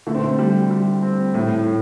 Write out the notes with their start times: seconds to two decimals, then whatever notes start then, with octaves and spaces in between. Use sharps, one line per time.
0.07 D3 A3
0.15 C4
0.24 A3
0.39 G3
0.71 G3
1.02 C4
1.34 A2 A3
1.66 A2